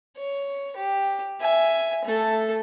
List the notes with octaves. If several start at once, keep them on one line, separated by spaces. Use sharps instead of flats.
C#5
G4
E5 G#5
A3 A4